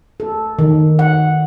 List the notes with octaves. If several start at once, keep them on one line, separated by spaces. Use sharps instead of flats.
A4
D#3
F#5